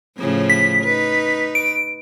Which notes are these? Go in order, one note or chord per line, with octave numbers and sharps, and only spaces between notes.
A2 C#3 F3
B6
D#4 B4
D7